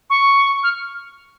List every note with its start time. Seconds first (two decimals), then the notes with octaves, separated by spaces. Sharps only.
0.10 C#6
0.63 F6